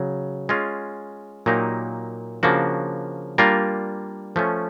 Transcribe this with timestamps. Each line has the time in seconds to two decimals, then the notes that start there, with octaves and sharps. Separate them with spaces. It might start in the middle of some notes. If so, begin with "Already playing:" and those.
Already playing: C#3 F#3
0.49 G#3 C#4 F4
1.46 A#2 F#3 A#3 D#4 G4
2.43 C#3 F3 A#3 D4 F#4
3.38 G3 A#3 D4 F4 A#4
4.36 F3 A3 C#4